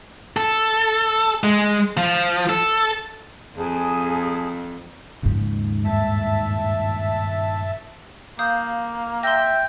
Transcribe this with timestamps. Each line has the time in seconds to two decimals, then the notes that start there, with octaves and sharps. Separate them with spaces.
0.37 A4
1.44 G#3
1.97 F3
2.49 A4
3.57 F2 G#4 A5
5.23 D#2 G#2 C#3 F3
5.85 G2 A#2 D#3 E5 A5
8.39 A#3 F5 D#6 G6
9.23 E5 G5 C6 A#6